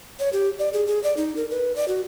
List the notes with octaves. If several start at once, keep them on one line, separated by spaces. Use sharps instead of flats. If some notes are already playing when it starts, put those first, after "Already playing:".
C#5
G4
D5
G#4
G#4
D5
D#4
A#4
B4
D5
F#4